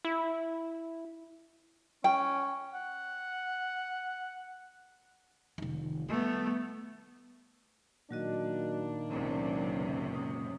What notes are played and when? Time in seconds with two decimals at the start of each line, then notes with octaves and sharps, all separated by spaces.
0.05 E4
2.04 C#4 G5
2.74 F#5
5.58 F1 D#3
6.09 G3 A3 B3
8.11 A#2 D#3 F#3 A#3 D4 F#4 D#5
9.11 C#2 F#2 C3 C4
10.15 D#6